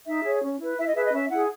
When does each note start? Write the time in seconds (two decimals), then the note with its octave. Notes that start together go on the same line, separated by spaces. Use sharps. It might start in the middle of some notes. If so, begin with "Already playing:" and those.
0.06 D#4 E5
0.23 G#4 C#5
0.41 C#4
0.60 E4 B4
0.78 E4 E5
0.86 D#5
0.95 G#4 B4 E5
1.04 D#5
1.13 C#4 E5
1.30 E4 G#4 F#5